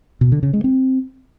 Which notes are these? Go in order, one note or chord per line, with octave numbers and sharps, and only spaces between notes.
B2
D3
C#3
G#3
C4